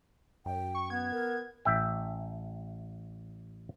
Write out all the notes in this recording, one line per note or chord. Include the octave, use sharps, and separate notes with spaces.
F#2 G5
C#6
B3 G#6
A#4
A1 E5 G5